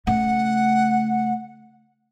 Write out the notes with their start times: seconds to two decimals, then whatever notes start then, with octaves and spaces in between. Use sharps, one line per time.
0.07 C#3 A3 F#5